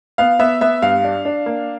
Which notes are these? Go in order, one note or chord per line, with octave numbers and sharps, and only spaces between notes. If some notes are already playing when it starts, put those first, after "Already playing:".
B3 F5
B3 E5
B3 E5
G2 F5
D4
D4
A#3